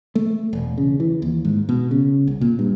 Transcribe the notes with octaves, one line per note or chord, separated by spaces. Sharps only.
A3
E1
C#3
E3
D#2
G#2
B2
C#3
C2
A#2
G2